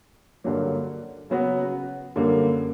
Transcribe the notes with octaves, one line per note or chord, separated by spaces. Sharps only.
G2 D3 F#3 A#3
C#3 F#3 B3 F#4
F#2 D3 G3 A#3